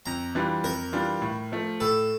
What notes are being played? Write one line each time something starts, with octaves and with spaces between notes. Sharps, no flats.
F2 A#5
E3 G3 D4 F4
F2 A#4
E3 G3 D4 F4
A2
F3 A3
A2 A4